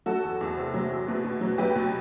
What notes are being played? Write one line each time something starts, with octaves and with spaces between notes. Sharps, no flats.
F#3 F#4 A4
E2
E2
C3
F#3
E2
B2
B2
F#3
F#3 G4 B4
B2